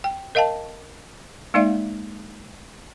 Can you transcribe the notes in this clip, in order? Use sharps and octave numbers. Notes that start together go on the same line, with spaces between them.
G5
A#4 D#5 F5 G5 A5
G#3 A#3 D#4 D5 E5 F5